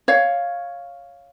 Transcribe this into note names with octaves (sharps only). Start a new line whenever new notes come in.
C#5 F5